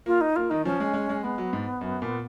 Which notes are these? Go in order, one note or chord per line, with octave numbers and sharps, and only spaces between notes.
A#3 F4
D#4
A#3 F4
D#3 D#4
F3 C#4
G#3
G#3
G#3
G#3 B3
F#3
G#2
F#2
A#2